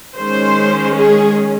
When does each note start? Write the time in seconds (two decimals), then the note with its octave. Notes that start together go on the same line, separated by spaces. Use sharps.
0.16 D#3 G#3 C#4 C5
0.94 G#4